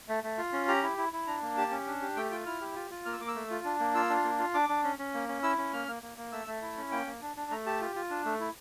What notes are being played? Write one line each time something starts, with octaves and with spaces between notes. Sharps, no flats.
A3
A3
F4
C#4
G4 A#5
E4
E4
E4
D4 A#5
A#3
G4 A5
C#4
D4
G4
A3 G5
F4 G5
E4 F6
G4
F4
F4
A#3 F6
E6
A#3 D6
E6
A3
F4
D4
A#3
F4 E6
D4
A#3
F4
D4 D6
D4
C#4
C#4
A#3
C#4
E4 E6
C#4
A#3 F6
A#3
A#3
A#3
A3 E6
A3
E4
C#4
A#3 G5
A#3
D4
D4
A3 A#5
G4 A5
F4
F4
D4
A3
E4